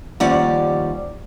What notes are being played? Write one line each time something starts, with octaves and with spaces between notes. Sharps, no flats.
D#2 F3 G3 C#4 D5 F#5